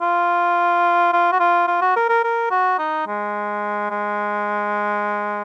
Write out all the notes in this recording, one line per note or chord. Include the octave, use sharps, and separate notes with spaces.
F4
F4
F#4
F4
F4
F#4
A#4
A#4
A#4
F#4
D#4
G#3
G#3